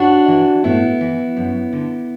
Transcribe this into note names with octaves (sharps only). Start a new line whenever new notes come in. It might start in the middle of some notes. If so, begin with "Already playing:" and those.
Already playing: D4 F#4
E3
A2 B3 E4
E3
F#2
D3